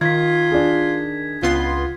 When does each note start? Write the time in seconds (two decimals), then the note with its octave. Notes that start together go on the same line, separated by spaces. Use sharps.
0.01 D#3 F4 G#6 B6
0.51 D4 G#4
1.42 C#2 B3 F4 C6